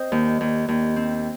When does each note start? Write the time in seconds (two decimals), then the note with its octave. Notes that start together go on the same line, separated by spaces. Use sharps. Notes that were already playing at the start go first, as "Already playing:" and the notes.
Already playing: C4 C5 D#5
0.12 D#2
0.41 D#2
0.68 D#2
0.96 C4